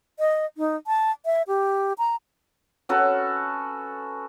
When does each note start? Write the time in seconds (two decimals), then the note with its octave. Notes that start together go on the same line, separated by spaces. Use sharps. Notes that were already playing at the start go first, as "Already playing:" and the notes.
0.19 D#5
0.57 D#4
0.87 A5
1.25 E5
1.47 G4
1.98 A#5
2.89 C#4 F#4 A4 B4